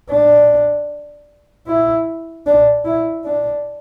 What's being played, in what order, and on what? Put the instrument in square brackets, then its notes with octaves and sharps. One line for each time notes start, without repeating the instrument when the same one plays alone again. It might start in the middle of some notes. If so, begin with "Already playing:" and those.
[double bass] D4
E4
D4
E4
D4